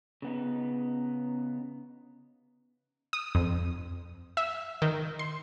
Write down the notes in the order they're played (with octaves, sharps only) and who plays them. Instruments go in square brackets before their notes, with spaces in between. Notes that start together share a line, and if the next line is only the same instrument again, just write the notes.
[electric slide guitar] C#3 B3 D#4
[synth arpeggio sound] D#6
F2
E5
D#3
C6